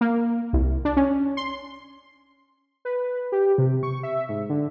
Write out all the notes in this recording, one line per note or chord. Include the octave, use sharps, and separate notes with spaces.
A#3
C2
D4
C#4
C6
B4
G4
C3
C#6
E5
G#2
D3